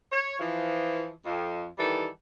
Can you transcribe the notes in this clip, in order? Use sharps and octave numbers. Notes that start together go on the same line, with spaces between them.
C#5
E3 F3
F2
D#3 E3 G3 A4